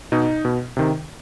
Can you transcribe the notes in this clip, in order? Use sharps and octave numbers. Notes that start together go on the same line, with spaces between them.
B2 D#4
B2
C3 D#3